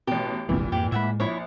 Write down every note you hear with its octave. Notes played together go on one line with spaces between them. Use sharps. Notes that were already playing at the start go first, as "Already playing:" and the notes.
A1 B2 G4
F1 A#1 A#2 E3 G#3
F2 G#2 G4
A2 G#3 E5 F#5 B5
A#1 E4 C#5